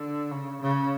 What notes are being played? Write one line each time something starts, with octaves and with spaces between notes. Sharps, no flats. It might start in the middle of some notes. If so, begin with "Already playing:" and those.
Already playing: D3
C#3
C#3